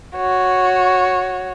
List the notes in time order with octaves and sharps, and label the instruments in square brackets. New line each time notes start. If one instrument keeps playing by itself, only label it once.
[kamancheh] F#4 C#5